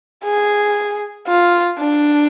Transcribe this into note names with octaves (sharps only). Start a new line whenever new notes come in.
G#4
F4
D4